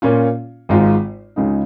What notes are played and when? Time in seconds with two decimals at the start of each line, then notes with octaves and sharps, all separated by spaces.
0.02 A#2 A#3 C#4 F4
0.69 G#1 G#2 G#3 F4
1.36 C#2 C#3 G#3 D#4